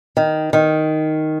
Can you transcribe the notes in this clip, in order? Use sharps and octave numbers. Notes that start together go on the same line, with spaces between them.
D#3
D#3